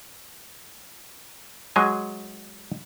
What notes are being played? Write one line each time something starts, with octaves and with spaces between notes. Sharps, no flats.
F#3 G#3 G#5